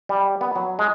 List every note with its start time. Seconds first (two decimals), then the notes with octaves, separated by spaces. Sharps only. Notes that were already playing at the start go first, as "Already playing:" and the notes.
0.09 G3
0.41 B3
0.56 F#3
0.79 G#3